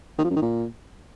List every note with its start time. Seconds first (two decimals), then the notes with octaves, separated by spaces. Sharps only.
0.18 D#3
0.24 F3
0.30 F#2
0.36 D#3
0.42 A#2